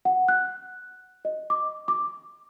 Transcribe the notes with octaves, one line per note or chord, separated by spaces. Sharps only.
F#5
F#6
D#5
D6
D6